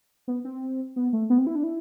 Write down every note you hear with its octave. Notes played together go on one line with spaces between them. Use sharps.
B3
C4
B3
A3
B3
C4
E4
D4
E4